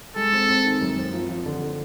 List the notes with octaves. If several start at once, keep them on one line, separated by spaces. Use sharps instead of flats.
G#3 A4
C4
C4
D#3
F#2
C4
F3
F3
D3
D3